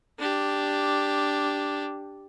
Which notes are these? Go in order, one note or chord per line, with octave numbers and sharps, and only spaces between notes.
D4 G4